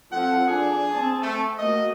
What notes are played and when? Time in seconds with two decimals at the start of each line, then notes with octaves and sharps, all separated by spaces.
0.12 F3 C4 A4 F#5
0.47 D4 G#4
0.91 C4 A5
1.22 A3
1.58 A3 A#3 F#4 D#5